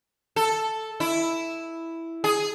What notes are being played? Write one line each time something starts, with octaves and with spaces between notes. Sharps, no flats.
A4
E4
G#4